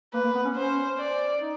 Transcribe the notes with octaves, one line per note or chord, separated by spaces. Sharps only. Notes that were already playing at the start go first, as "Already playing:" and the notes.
A#3 B4
A#3
B3
C#4
C#4 C5
D5
D#4